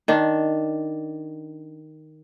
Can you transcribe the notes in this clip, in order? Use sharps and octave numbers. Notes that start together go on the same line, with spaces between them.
D#3 D4